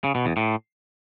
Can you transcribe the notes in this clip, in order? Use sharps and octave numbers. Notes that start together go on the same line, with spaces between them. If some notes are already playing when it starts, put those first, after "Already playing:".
C#3
B2
E2
A2